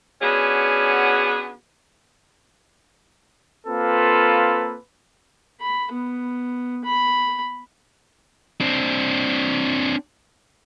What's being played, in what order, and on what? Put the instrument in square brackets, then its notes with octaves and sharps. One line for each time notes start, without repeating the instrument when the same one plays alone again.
[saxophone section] B3 C#4 D4 F#4 G#4
[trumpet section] A#3 C4 F4 A4 B4
[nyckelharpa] B5
B3
B5
[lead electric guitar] C4 D4